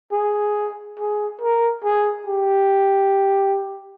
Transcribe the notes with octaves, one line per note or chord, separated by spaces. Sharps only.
G#4
G#4
A#4
G#4
G4